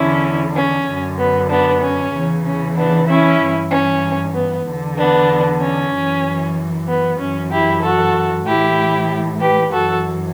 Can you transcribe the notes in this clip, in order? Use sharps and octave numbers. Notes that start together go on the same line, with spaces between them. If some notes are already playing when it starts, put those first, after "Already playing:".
Already playing: E2 D3 C#4 E4
C#4
F#2 D3
B3
B3 D4
C#4
E2 C#3 E3
C#4
B3 D4
C#4 E4
G2 E3
C#4
B3
E2 D3
B3 D4
C#4
F#2 E3
B3
F#2 E3 C#4
E4 G4
F#4 A4
A2 E3 E4 G4
G4 B4
F#2 E3 F#4 A4